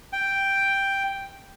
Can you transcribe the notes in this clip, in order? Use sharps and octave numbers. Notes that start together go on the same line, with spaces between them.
G5